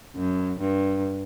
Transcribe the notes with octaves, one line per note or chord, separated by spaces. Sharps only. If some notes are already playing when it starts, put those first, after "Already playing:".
F#2
G2